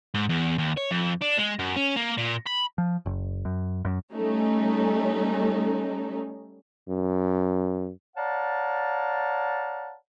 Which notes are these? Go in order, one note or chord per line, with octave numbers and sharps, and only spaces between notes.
G#2
E2
D#2
C#5
F2
D4
G#3
F#2
C#4
A#3
A#2
B5
F3
F#1
F#2
F#2
G3 A3 C#4 D#4
F#2
C#5 D5 F5 F#5 A5 A#5